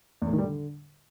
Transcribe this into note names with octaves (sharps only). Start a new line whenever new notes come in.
E2
A2
D#3
G3
D3